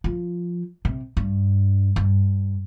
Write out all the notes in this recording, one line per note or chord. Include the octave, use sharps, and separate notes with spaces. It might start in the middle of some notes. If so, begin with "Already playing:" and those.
F3
C3
G2
G2